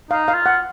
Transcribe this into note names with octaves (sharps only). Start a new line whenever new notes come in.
D#4 F5
F5
F4
F#5